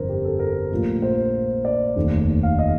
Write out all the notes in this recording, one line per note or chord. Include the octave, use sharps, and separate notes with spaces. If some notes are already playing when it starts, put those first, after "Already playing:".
Already playing: G1 F2 D3 A#4 C5
G4
A4
A#4
A#1 A#2 F3 A3
C5
D5
F1 D#2 D#3 A3
F5
D#5